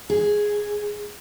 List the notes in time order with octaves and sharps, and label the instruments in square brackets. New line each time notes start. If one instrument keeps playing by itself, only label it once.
[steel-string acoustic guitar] G#4